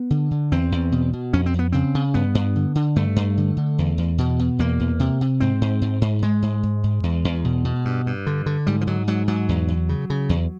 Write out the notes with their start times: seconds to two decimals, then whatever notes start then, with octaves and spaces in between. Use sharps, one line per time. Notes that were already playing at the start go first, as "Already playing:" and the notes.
Already playing: B3
0.10 D3
0.31 D3
0.52 E2 C4
0.72 E2
0.92 B2
1.13 B2
1.33 F2 C#4
1.46 C4
1.54 F2 B3
1.72 C#3 C4
1.95 C#3
2.14 G2 B3
2.35 G2
2.56 D3
2.75 D3
2.96 G2 A3
3.16 G2
3.37 D3
3.57 D3
3.78 E2
3.98 E2
4.18 B2
4.39 B2
4.59 E2 A#3
4.80 E2
5.00 C3
5.21 C3
5.40 G#2 C4
5.61 G#2
5.82 G#2
6.01 G#2
6.22 G#2 G#3
6.42 G#2
6.63 G#2
6.84 G#2
7.03 E2
7.25 E2
7.44 B2
7.64 B2
7.85 G2
8.06 G2
8.26 D3
8.46 D3
8.67 G#2 G3
8.81 F3
8.87 G#2 F#3
9.07 G#2 F#3
9.28 G#2 F#3
9.49 E2
9.68 E2
9.89 C#3
10.10 C#3
10.29 E2